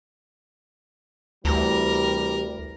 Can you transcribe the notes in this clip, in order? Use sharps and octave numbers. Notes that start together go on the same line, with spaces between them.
D2 C3 E3 G3 A#4